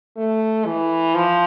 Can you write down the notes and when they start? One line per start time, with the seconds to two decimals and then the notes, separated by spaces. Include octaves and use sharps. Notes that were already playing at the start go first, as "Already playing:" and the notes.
0.17 A3
0.66 E3
1.15 F3